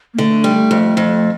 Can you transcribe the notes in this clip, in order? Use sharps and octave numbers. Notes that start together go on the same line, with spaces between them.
A#3
D3 A3
G3
F2
F2